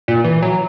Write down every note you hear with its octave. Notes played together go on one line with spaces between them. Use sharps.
A#2
E3
F#3